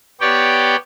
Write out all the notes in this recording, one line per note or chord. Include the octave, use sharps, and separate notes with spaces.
B3 G4 C#5 D5 G5